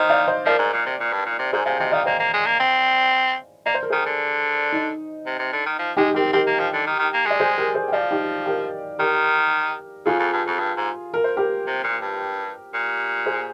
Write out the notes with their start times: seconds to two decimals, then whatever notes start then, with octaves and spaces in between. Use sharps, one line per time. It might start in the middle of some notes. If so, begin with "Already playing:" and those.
Already playing: D#3 D#4 C5 D#5
0.10 D5 F5
0.28 C5 D#5
0.46 F3 A#4 D5
0.59 G#2
0.73 A#2
0.86 C3
1.00 A#2
1.12 G2
1.26 A#2
1.39 C3
1.52 G#2 G#4 C5
1.65 C3 F5 G#5
1.80 C3 D#5 G5
1.92 D#3 D5 F5
2.06 A#3 C5 D#5
2.19 A#3
2.33 G#3
2.46 A#3
2.60 C4
3.66 A#3 D5
3.74 C5
3.83 A#4
3.90 D#3 G#4 C5
4.06 D3
4.72 D#4
5.26 C3
5.39 C3
5.52 D3
5.66 D#3
5.79 F3
5.97 G#3 D#4 G4
6.14 C4 G4 A#4
6.33 C4 G4 A#4
6.47 A#3
6.59 F3
6.73 D3
6.87 D#3
6.99 D#3
7.13 A#3
7.26 G#3 D5
7.40 G#4 C5
7.58 G4 A#4
7.74 G#4 C5
7.88 G5
7.92 F3 D5 F5
8.11 D#4 G4
8.46 G4 A#4
8.99 D#3 G4 A#4
10.06 F2 F4 G#4
10.19 F2
10.32 G2
10.47 F2
10.59 G2
10.77 G#2
11.14 A#4
11.24 C5
11.37 G4 A#4
11.67 C3
11.84 A#2
12.01 G2
12.74 A#2
13.26 G#4 C5